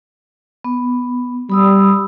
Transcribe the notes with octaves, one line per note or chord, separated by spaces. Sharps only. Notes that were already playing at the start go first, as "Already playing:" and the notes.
B3
G3 B5 D#6 E6